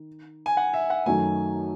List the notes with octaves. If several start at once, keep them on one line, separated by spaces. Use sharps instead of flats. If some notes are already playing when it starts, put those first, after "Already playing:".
Already playing: D#3
G#5
F#5
E5
F#5
F#2 D#3 F#3 A3 G#5